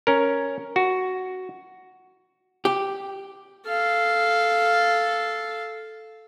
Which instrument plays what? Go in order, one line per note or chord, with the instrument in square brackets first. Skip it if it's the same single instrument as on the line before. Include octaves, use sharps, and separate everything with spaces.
[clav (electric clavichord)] C#4 A#4
F#4
[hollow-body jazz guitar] G4
[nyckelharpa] A4 F5